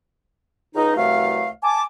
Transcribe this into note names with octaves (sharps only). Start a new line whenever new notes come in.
C#2 D#4
C2 E3 F#3 A3 F5
G#5 A5 D6